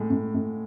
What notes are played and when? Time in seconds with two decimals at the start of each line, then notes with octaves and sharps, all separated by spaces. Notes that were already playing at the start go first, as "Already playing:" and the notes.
Already playing: A2 G#3
0.10 A2
0.34 A2